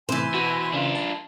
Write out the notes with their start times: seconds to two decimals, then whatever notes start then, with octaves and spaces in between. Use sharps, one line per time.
0.09 A2 C3 E3 C5 E5 G#5 C6
0.34 B2 F#4
0.73 C#3 D4 F4
0.95 A5